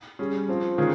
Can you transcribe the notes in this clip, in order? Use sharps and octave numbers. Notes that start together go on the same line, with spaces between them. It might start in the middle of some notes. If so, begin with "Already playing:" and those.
G3 C#4 G#4
F3 C4 F4
D#3 G#3 C#4 F4 G#4